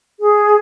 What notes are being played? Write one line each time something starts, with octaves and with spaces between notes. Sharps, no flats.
G#4